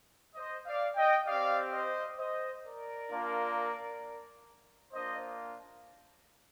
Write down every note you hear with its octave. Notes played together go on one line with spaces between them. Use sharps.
C5 D#5
D5 F5
D#5 G5
C4 G4 D5 F5
C5 D#5
C5 D#5
A#4 D5
A#3 D4 F4
A#3 D4 F4 C5 D#5